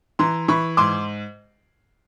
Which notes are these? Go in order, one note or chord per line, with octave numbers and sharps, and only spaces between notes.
E3 A#5 C6
E3 B5 C#6
G#2 C6 D6